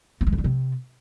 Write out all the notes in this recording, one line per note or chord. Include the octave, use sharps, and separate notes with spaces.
A#3
G#3
D3
G3
C3